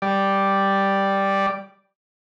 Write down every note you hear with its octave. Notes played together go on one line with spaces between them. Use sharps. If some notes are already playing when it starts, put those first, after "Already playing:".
G3 D5